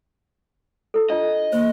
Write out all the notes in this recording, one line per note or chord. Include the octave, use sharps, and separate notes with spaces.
E4 A4
D4 F4 D#5
A#3 C5